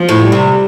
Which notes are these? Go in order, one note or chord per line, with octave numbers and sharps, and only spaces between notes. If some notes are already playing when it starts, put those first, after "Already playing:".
Already playing: F3
A2
G3
C3